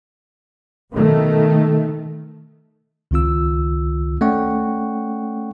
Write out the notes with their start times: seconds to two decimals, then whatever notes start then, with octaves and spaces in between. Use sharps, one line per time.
0.92 B2 D#3 A3
3.11 C#2 D#3 C4 F4 E6
4.21 A3 C#4 D5 F#5 G5 C#6